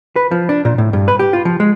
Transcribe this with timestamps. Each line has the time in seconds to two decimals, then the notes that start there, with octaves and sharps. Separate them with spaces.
0.16 B4
0.31 F3
0.49 D4
0.65 A#2
0.78 A2
0.93 G2
1.08 B4
1.19 G4
1.33 F4
1.45 F3
1.60 G#3